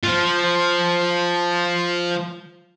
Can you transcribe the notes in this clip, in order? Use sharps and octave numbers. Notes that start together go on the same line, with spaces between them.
F3 F4